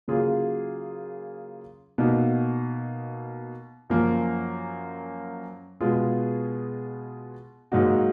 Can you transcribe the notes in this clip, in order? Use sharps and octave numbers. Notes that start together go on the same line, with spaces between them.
C#3 F#3 A#3 F4 G#4
B2 A#3 D#4
F#2 F3 A#3
B2 G#3 B3 F4 G#4
G#2 F#3 A#3 D#4 F#4